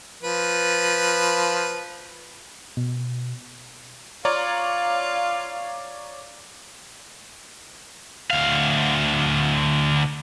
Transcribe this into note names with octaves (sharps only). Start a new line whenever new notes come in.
F3 B4
B2
F4 C#5 D5 F5 A#5
D2 F5